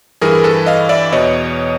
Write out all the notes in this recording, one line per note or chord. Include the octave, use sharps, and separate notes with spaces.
G2 E3 G#4 A#4
A4 B4
D#5 F5
D5 E5
E2 B2 C#5 D#5